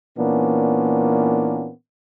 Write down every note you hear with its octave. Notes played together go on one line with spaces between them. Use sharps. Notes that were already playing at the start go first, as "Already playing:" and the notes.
A#2 E3 A#3 B3 C#4 D4